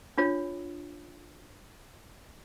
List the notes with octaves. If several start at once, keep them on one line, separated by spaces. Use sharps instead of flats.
D4 F4 C#5